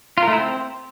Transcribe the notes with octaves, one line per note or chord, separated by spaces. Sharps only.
F4
A#4
A3
E4
C4